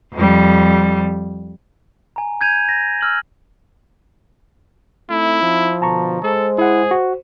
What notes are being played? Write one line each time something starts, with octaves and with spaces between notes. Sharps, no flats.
F2 G3
G#5 A#5
G6 G#6 D#7 F7
A#6
E6 F6 F#7
A3 C4 D#4 E4
F3
B2 D3 A5 A#5 C#6
G#3 A4 C5
E4 G#4 F#5
F#4